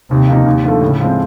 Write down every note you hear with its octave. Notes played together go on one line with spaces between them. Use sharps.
D#2 C3
C#3 F3 A#3 D#4
D#2
D3 F3 A3
A2 C#3
F3 G#3 C4